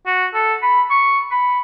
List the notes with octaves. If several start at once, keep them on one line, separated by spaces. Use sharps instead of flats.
F#4
A4
B5
C#6
B5